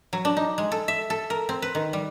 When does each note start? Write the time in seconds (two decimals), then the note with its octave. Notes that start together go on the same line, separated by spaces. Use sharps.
0.13 F#3
0.25 D4
0.37 D#4
0.58 G#3
0.72 A4
0.88 E5
1.10 A4
1.30 A#4
1.49 C4
1.62 B4
1.75 D#3
1.93 G3